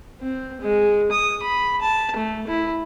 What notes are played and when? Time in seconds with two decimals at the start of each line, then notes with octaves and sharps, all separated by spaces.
0.21 C4
0.61 G#3
1.11 D#6
1.42 B5
1.81 A5
2.16 A3
2.47 E4